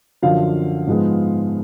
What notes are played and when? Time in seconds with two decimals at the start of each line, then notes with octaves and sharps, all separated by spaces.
0.22 F#2 D3 F3 F5
0.87 G#2 F3 G#3 B3